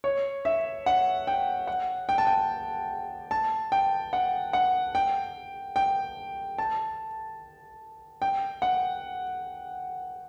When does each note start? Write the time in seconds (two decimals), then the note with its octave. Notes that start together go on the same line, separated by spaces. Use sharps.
0.04 C#5
0.45 E5
0.86 F#5
1.27 G5
1.67 F#5
2.09 G5
2.18 A5
2.27 G5
3.31 A5
3.72 G5
4.13 F#5
4.53 F#5
4.95 G5
5.76 G5
6.58 A5
8.22 G5
8.62 F#5